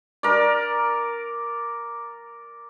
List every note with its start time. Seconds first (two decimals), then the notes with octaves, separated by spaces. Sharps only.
0.23 A#4 D5